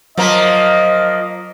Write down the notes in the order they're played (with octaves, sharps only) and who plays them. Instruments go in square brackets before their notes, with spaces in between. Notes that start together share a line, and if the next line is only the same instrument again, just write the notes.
[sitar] F3 A#3 [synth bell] F#3 A#5 B6 [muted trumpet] D#5